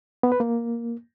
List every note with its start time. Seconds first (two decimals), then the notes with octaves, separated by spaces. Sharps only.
0.23 B3
0.32 B4
0.40 A#3